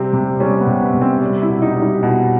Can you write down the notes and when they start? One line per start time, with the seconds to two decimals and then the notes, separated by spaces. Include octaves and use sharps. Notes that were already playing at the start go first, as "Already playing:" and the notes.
Already playing: C3 G3 C4
0.13 C3
0.40 G3 C#4
0.61 B3
0.67 C3
0.80 B3
0.94 C3
1.02 C4
1.21 G3
1.42 E4
1.49 B2
1.62 D#4
1.76 G3
1.82 D#4
2.03 B2